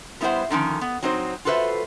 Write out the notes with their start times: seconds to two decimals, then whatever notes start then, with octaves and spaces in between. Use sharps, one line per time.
0.21 G3 B3 E4 F4 C5 F#5
0.50 D3 D#3 F3 C#4
0.81 B3
1.03 F#3 C4 D#4 C5
1.45 F4 F#4 A4 B4 C5 E5